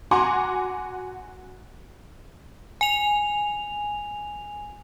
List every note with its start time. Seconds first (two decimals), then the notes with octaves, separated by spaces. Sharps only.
0.11 F#4 F#5 G#5 A#5 C6 D6
2.81 G#5 F7